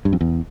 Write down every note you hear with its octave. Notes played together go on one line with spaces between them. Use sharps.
G2
F2
E2